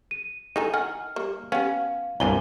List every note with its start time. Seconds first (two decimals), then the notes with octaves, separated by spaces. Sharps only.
0.11 D#7
0.56 E3 D#4 A4 G#5
0.74 D#3 F#5 G#5 F6
1.16 G3 A#3
1.52 B3 C#4 G4 F5
2.20 C2 G2 A#2 B3 G#5 B5 G7